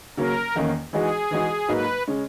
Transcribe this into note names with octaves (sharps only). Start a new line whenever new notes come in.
C#3 F#3 A#3 C#4 A#4
E2 D#3 A#3 C#4
E3 G#3 D#4 F#4 G#4
E3 G#3 D#4 F#4
G#2 F#3 A#3 D#4 F#4 B4
C#3 G#3 C#4